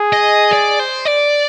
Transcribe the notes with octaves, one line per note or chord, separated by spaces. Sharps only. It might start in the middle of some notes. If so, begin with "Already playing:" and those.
Already playing: G#4
D#5
D5
C5
D5